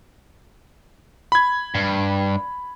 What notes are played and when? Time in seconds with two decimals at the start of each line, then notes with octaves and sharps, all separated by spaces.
1.32 B5 G#6
1.75 G2